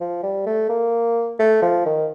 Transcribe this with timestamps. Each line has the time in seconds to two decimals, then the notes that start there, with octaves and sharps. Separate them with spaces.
0.01 F3
0.23 G3
0.46 A3
0.69 A#3
1.39 A3
1.62 F3
1.86 D#3